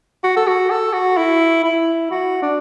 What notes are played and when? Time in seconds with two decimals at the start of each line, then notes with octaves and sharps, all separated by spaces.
0.23 F#4
0.36 A4
0.47 F#4
0.70 A4
0.93 F#4
1.17 E4
1.64 E4
2.11 F#4
2.42 D4